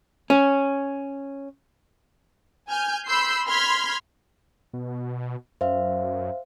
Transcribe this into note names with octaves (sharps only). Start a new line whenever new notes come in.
C#4
G#5 F6 G6
B5 C6 E6 G6 C7
B5 C6 F6 G#6 B6
B2
F#2 C5 E5 F5